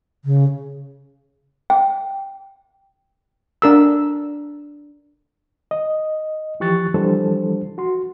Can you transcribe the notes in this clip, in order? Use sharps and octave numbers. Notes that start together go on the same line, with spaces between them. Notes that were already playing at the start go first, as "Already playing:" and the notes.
C#3
G5
D4 A#4 E6
D#5
E3 F3 G4 C#6 F#6 A6
E3 F3 G3 D4 A4 C5
F#4 C6